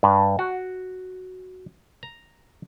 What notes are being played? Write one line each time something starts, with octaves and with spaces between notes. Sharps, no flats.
G2
F#4
A#5